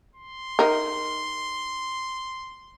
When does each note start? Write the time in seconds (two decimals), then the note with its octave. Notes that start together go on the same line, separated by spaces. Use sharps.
0.16 C6
0.59 D#4 A#4